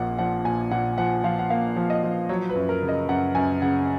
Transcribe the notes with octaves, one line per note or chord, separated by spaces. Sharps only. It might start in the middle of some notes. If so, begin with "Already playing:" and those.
Already playing: A#1 A#2 F3 A#3 F#5
F3 F#5
A#2 G#5
A#2 F#5
F3 F#5
F3 F5
F#5
A#3 F5
F3
D#5
F3
F#3 C#5
B4
F#2
A#4
C#3
D#5
F#2 F#5
F#2 G#5
C#3 F#5